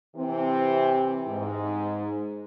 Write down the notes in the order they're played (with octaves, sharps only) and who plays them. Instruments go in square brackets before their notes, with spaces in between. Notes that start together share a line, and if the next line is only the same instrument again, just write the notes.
[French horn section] C3 E3 C4
G#2